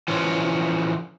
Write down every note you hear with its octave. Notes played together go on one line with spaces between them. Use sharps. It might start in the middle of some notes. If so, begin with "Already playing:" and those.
E3 F3 C#4